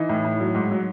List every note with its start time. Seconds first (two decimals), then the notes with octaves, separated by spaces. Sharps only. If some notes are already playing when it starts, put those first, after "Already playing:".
Already playing: E3 D#4
0.09 A2
0.25 A2
0.40 F#3
0.55 G#2
0.71 F#3